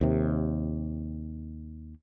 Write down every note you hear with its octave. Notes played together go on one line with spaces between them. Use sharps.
D#2 C3